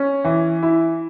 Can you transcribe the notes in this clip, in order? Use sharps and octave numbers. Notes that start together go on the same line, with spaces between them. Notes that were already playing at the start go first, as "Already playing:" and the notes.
Already playing: C#4
E3
E4